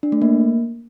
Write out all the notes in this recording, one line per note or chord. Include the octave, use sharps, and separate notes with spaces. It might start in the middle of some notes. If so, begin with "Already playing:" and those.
D4
A3
A#3